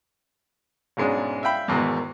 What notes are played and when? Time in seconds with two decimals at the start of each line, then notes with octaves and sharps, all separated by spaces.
0.97 B1 G#2 G#3 C#4 D4
1.43 E5 F5 G5 B5
1.68 E2 G#2 B2 D#3